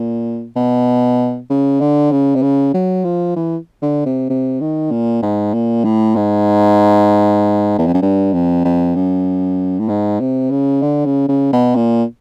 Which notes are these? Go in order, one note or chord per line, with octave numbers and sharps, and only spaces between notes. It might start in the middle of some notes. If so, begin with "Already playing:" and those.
Already playing: A#2
B2
C#3
D3
C#3
C3
C#3
F#3
F3
E3
D3
C3
C3
D#3
A#2
G#2
A#2
A2
G#2
E2
F2
F#2
G2
F2
F2
F#2
A2
G#2
C3
C#3
D3
C#3
C#3
B2
A#2